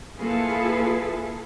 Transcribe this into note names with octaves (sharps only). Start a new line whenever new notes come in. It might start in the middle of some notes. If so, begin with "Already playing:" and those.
A#3 E4 F4 G#4 A4 B4